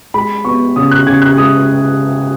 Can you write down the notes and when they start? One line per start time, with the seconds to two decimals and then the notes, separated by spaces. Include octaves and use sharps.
0.14 G#3 B5
0.45 B3 C#6
0.76 C#3 D#6
0.91 F#6
1.07 C#3 G#6
1.22 F#6
1.38 G#3 D#6